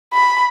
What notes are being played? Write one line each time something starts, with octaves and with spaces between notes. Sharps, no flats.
B5